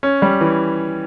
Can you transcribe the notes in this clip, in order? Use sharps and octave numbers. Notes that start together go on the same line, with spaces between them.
C#4
G3
E3